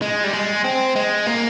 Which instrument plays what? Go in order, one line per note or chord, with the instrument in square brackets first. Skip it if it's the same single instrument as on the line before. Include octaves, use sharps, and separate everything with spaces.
[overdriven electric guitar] G#3
G3
G#3
C4
G#3
A#3